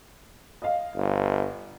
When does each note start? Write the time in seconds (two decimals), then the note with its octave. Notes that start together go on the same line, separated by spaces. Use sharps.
0.62 D#5 F5
0.96 G1